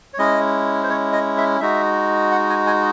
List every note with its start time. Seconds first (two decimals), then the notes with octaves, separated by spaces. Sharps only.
0.14 C#5
0.18 G#3 C#4 E4 D#5
0.83 C5
0.89 C#5
1.13 D#5
1.37 E5
1.60 G#3 D#4 F#4 E5
2.32 F#5
2.50 G#5
2.67 G#5